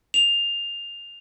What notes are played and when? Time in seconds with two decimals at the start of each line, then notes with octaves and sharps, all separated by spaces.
0.14 F7